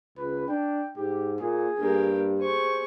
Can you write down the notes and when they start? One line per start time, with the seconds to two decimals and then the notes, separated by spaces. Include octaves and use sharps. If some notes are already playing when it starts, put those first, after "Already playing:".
0.17 C#2 B4
0.48 D4 G5
0.96 G#2 G4
1.40 A#2 G#4
1.79 G2 A#3 G4
2.39 G#4 C5 C#6